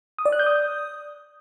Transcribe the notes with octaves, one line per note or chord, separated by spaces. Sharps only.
D#6
D5
F#6
G6
D#6